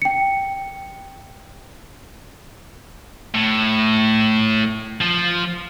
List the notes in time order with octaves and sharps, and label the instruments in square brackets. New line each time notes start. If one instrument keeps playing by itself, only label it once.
[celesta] G5 C#7
[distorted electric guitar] A2
F3